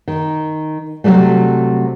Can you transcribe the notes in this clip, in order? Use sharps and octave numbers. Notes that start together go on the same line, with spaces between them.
D#3
C3 D#3 F#3 G3 A3